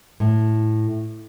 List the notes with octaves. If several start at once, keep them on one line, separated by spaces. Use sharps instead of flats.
A2